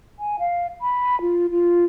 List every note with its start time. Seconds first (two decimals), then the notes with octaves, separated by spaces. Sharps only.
0.19 G#5
0.39 F5
0.81 B5
1.21 F4
1.51 F4